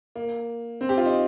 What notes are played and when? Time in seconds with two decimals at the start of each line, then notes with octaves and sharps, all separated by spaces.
0.15 A#3
0.81 C4
0.89 G4
0.97 F4
1.05 D#4